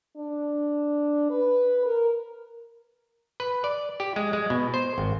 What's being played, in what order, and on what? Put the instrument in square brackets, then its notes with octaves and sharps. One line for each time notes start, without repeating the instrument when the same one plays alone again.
[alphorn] D4
B4
A#4
[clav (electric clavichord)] B4
D5
G4
G#3
G#3
B2
C5
G#1